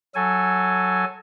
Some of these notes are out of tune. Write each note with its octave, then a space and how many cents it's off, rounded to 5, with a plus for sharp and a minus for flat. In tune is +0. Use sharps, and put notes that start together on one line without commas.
F#3 +0 A4 +0 G#5 +0